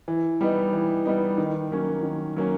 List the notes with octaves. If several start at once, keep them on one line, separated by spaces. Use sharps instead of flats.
E3
G3 B3 D#4
E3
G3 B3 D#4
D#3
F#3 A#3 C#4
D#3
F#3 A#3 C#4